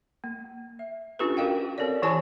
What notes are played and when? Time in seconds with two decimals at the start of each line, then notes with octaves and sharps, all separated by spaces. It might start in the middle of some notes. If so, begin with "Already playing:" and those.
0.24 A#3
0.79 E5
1.19 C#4 D4 F4 G4 A4 B4
1.37 F#4 G4 A#4 D#5 F5 G5
1.78 C4 A4 A#4 C#5 D5
2.02 E3 E4 G4 C#5 G#5 A5